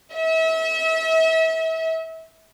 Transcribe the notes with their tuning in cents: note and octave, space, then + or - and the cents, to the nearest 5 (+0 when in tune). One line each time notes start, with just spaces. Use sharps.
E5 -35